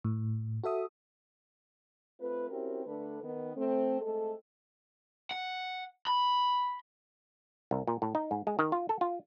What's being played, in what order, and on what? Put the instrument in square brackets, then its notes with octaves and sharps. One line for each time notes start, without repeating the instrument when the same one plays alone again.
[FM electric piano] A2
F#4 A4 E5 D#6
[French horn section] A3 C4 F4 B4
C4 C#4 E4 F#4 G4 A#4
D3 A3 D4 A4 B4
D#3 B3
A3 C4
G#3 A3 C4 A4
[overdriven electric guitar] F#5
B5
[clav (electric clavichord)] C2
A#2
A2
D#4
G#2
G#3
D#3
F4
A4
F4